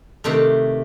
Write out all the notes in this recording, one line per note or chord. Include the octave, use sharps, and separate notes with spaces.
C3 D#3 A3 D4